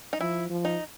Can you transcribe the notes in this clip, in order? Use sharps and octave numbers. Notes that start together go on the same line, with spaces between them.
D#4
F3 E4
F3
D#4